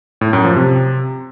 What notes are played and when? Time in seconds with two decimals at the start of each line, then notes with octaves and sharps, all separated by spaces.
0.21 A2
0.33 F#2
0.45 F3
0.56 C3